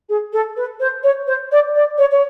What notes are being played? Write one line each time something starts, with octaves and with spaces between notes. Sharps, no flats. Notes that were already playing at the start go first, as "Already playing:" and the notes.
G#4
A4
B4
C5
C#5
C5
D5
D5
C#5
C#5